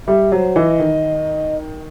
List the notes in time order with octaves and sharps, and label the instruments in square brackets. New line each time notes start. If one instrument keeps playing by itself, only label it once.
[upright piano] G3 [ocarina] E5
[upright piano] F#3 [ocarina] C5
[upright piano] E3 [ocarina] D#5
[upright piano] D#3